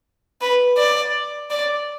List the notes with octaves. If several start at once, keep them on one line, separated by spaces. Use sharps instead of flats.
B4
D5
D5